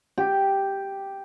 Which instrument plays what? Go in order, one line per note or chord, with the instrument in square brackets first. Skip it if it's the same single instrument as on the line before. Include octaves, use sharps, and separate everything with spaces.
[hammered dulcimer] G4